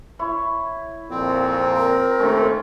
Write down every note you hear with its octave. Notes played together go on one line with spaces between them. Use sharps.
E4 C#5
F2 A#2 C4
A#4
D#2 A3 C#4 C6